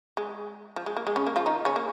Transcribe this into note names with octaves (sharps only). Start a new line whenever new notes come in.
G#3
F3
G#3
A#3
G#3
C#3 C#4
A#3
F3 F4
D#3 D#4
C#3 C#4
A#3